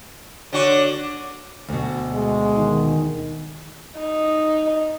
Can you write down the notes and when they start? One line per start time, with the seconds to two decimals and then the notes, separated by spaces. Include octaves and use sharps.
0.53 D3 F#4 C#5
1.68 D2 B2
2.14 G#3
2.58 D#3
3.99 D#4